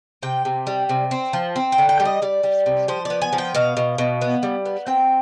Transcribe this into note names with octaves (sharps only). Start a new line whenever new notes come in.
C3 G5
C3
G3
C3
C4
F3
C4
G5
D3
G5
G3
D#5
G3 D5
G3
C3
F3 C5
B3 D5
G#5
F3
G5
B2 F5
B2
B2
B3
G3
B3
C4 G5